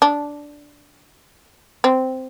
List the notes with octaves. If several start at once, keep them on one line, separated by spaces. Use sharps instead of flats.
D4
C4